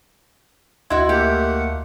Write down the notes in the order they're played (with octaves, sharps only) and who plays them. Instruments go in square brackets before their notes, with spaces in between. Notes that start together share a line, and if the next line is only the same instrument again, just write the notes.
[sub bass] D2 [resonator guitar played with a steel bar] E4 F#4 [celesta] D#5 C6 G#6
[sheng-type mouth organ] A3 A#3 F#5 [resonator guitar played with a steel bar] G4